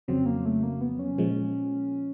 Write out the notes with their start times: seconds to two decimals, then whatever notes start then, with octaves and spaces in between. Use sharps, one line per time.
0.08 F2 C#3 F#3 C4
0.26 A#3
0.45 A3
0.63 A#3
0.81 B3
0.99 C#4
1.18 A#2 F3 G#3